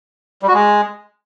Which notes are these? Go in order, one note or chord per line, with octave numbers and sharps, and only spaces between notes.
G3
F#4
G#3